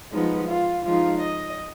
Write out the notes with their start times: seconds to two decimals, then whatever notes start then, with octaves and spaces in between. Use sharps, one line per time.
0.11 F3 G#3 B3 D#4
0.47 F4
0.84 F3 G#3 D#4 F4
1.20 D#5